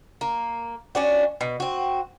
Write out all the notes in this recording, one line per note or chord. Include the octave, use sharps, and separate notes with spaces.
A#3
C#4 D4 F#4
B2
C4 F#4